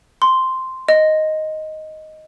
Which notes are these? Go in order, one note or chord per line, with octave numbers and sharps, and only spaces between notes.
C6
D#5